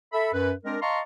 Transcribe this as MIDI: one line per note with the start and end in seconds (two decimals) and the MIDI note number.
0.13 0.30 69
0.13 0.30 76
0.13 0.30 83
0.33 0.52 42
0.33 0.52 71
0.64 0.77 56
0.64 0.77 60
0.64 0.77 62
0.64 0.77 70
0.81 1.00 75
0.81 1.00 77
0.81 1.00 81
0.81 1.00 82
0.81 1.00 84
0.81 1.00 85